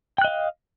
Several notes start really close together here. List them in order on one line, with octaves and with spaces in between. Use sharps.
G5 F#6 D#5 F5